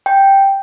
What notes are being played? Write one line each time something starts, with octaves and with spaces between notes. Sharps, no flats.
G5